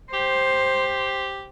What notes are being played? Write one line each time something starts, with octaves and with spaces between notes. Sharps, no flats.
G4 C5